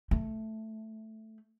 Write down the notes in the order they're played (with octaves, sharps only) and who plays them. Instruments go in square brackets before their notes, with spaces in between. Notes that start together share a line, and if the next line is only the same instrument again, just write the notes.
[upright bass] A3